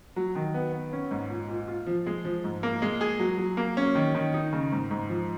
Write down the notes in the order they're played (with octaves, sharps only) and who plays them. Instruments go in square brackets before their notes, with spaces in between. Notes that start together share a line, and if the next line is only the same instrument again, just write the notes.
[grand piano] F#3
D#3
B3
B3
C#4
G#2
A#2
A#2
F4
F3
G#3
F3
G#2
A#3
G#3
G#4
F#3
F#3
A#3
C#4
D#3
D#3
D#4
C#3
G#2
G#2
F3